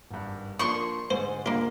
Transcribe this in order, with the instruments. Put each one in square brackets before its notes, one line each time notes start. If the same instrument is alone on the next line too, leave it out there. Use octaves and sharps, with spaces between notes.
[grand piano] G#1 G2
[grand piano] F3 A#3 D4 [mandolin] C6 C#6
[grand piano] G#2 D3 G#5 [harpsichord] C5
[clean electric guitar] A#3 [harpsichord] D4 F4